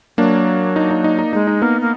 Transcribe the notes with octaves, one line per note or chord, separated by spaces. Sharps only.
F#3 A#3 D4
D#4
D#4
D#4
D#4
G#3 D#4
D#4
A#3 B3 D#4
A#3